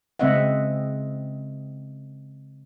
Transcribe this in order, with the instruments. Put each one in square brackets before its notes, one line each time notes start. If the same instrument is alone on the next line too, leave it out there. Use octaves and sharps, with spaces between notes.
[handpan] C#3 G#3 C4 D#5 E5 F#5